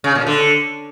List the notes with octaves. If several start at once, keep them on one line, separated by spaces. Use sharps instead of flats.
C#3
A#2
D3